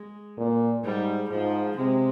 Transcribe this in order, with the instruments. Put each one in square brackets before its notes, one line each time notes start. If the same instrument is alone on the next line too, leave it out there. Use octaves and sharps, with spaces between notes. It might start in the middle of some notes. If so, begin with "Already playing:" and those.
Already playing: [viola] G#3
[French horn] A#2
[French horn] G#2 [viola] G3
[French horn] G#2 [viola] F3
[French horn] C3 [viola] G#3